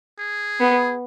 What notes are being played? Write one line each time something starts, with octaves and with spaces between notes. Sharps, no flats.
G#4
B3